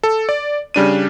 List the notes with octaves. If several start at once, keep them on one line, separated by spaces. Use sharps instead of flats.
A4
D5
C#3 G3 D4 D#7